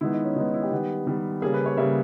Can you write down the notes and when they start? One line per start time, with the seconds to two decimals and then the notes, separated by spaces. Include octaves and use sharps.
0.01 D#3 G#3 B3 E4
0.13 D#4
0.25 C#4
0.36 D#3 G#3 B3 D#4
0.54 E4
0.63 G4
0.71 D#3 G3 B3
1.07 D#3 G3 B3
1.42 C#3 G3 A#3 G#4
1.54 B4
1.66 C#5
1.77 C#3 G3 A#3 E5